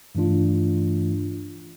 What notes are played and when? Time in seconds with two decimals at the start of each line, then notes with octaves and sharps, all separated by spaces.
0.15 G2 E3 A3 D4 F4